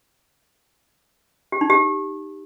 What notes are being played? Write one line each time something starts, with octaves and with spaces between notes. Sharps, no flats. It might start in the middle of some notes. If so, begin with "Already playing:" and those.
G4
D#4
G4